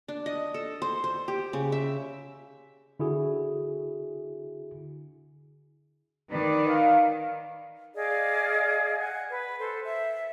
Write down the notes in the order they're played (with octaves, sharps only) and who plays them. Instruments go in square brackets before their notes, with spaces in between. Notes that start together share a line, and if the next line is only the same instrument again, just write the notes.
[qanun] D4
D#5
A4
C5
C5
G4
C#3
E5
[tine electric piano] D3 E4 F#4 G#4
[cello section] D#3 [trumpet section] B4 D5
[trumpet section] F5
[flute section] G#4 D5 D#5 F5
F#5 G#5
B4
A4 C5
E5